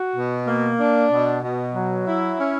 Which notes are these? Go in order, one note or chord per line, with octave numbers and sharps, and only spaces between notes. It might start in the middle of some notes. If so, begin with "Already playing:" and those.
Already playing: F#4
B2
A#3
D4
B2
B2
F#3
E4
C#4